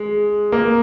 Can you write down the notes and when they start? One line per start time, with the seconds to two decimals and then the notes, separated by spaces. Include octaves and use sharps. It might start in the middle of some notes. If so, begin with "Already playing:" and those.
Already playing: G#3
0.52 A#3